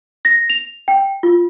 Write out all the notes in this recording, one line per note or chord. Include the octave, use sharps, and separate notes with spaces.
A#6
F7
G5
F4